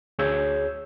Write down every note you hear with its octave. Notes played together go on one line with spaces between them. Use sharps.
D2 G#4 C#5 E6 G6 G#6